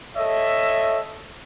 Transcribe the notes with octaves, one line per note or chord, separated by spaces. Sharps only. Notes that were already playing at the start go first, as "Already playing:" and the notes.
A4 C#5 D#5 E5